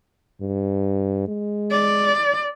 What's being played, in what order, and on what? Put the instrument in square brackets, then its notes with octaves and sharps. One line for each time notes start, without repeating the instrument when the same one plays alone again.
[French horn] G2
G#3
[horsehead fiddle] D5